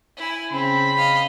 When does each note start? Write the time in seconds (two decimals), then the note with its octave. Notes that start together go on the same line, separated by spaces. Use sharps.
0.17 E4 G#5
0.52 C#3 C4 B5
0.97 D#5 F5